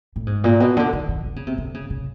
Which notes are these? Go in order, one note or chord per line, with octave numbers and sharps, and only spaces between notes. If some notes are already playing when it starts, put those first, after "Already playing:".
A2
G#2
A#2
B2
D3
D#3
D#3
D3
C#3
C3
D3
C#3
C#3